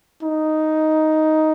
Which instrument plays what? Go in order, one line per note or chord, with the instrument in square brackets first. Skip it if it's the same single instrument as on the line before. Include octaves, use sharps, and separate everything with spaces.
[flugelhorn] D#4